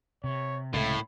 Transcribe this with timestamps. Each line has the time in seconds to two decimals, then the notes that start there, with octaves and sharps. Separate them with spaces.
0.24 C3 C#5
0.74 C#2 A2 A3 B5